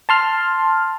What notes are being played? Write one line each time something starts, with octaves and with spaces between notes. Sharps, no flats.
A5 C6 F6